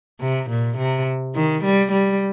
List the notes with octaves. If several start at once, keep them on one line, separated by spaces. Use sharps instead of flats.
C3
A#2
C3
D#3
G3
G3